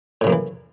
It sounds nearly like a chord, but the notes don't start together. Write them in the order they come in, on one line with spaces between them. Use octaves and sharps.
A2 C#3 F#2 A#3 E3